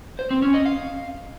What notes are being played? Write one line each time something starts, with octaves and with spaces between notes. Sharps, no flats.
C5
C4
C#4
D#5
F5